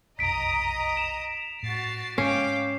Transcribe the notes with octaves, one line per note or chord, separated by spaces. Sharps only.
F1 B1 F#2 D#5 A#5 D#6 B6 D7
E7 F7
A2 F#4 A6 C7
G#2 G#3 C#4 F5 G5 D6 C7